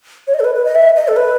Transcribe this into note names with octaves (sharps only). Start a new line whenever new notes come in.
C#5
D#5
A4
B4
B4
D#5
E5
D#5
A4
B4